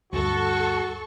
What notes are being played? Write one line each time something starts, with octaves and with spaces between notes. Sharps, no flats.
D2 G2 F#4 A4 C#6